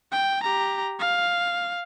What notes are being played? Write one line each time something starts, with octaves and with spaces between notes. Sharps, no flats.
G5
G4 A#5
F5